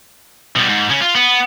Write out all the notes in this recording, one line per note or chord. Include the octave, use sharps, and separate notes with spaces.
B2 G3
G#2
C#3 C#4
F4
B3